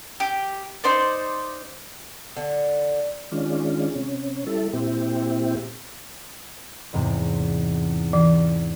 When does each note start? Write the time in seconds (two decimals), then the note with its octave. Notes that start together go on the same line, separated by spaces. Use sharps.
0.20 G4
0.84 D#4 C5 D5
2.36 D3
3.32 D#3 G#3 C#4 D4 F4
3.96 C3 C#4
4.47 G3 E4 A4
4.73 A#2 C4 E4 G4
6.93 E2 G#2 C3
8.13 E3